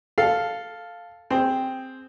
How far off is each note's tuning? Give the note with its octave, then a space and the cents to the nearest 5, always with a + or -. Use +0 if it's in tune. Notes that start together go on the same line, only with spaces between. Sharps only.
A4 +0 F5 +0
C4 +0 G#4 +0